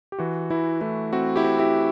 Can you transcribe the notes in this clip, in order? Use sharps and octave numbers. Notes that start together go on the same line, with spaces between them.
G4
E3 F#4
E3 E4
A3 E4
C4 F#4
E4 G4
C4
E4 G4